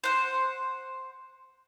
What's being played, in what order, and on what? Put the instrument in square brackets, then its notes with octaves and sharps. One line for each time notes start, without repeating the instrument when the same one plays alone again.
[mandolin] C5 F#5